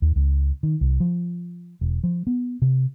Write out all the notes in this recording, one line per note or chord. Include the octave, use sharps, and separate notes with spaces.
D#2
C#2
D#3
C2
F3
E1
F3
B3
C3